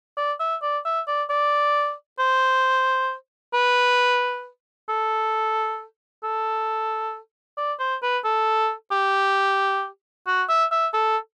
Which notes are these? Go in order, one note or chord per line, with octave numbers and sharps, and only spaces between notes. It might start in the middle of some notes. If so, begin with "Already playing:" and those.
D5
E5
D5
E5
D5
D5
C5
B4
A4
A4
D5
C5
B4
A4
G4
F#4
E5
E5
A4